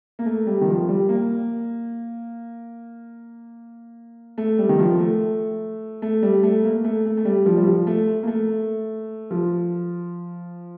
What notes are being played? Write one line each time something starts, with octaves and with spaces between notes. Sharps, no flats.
A#3
A3
G3
D#3
F3
G3
A#3
A3
G3
D#3
F3
A3
A3
G3
A3
A#3
A3
A3
A3
G3
F3
G3
F3
A3
A#3
A3
F3